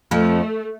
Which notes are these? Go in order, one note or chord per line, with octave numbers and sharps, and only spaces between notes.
F2 F3 A3